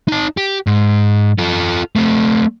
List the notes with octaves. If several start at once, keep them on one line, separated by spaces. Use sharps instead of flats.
D#4 A5
G4
G#2
F4 A4
A3 C4